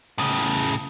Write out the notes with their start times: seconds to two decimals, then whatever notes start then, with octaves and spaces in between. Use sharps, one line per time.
0.18 A2 C#3